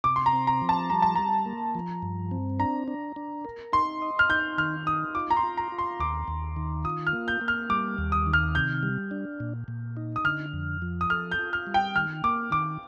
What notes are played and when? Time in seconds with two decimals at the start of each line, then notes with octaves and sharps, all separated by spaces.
0.04 C3 D6
0.16 C6
0.26 A#5
0.33 C4
0.47 A#5
0.62 F3
0.69 A5
0.90 G3 A#5
1.02 A5
1.15 G3 A#5
1.46 A#3
1.75 F3
2.02 G2
2.31 C4
2.59 D4 A#5
2.88 D4
3.16 D4
3.45 A#4
3.72 D#4 C6
4.02 D#5
4.19 F6
4.29 D#4 G6
4.58 D#3 F6
4.86 D#4 D#6
5.15 F4 D6
5.30 A#5
5.37 C6
5.43 F4
5.57 A#5
5.72 F4
5.78 C6
5.99 D#2 D6
6.28 D#2
6.56 D#3
6.84 F4 D#6
7.07 F6
7.13 A#3
7.28 G6
7.41 A#3
7.48 F6
7.70 G3 D6
7.98 D#2
8.12 D#6
8.26 D#3
8.33 F6
8.55 C3 G6
8.83 G3
9.11 D4
9.40 A#2
9.68 A#2
9.97 D#4
10.16 D#6
10.24 D3 F6
10.53 F2
10.82 F3
11.01 D#6
11.10 A4 F6
11.31 G6
11.39 F4
11.53 F6
11.67 G3
11.74 G5
11.95 D#3 F6
12.24 A#3 D6
12.51 D#3 D6